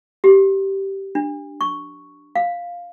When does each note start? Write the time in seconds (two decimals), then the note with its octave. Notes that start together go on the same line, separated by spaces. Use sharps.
0.24 G4
1.15 D4
1.61 C#6
2.35 F5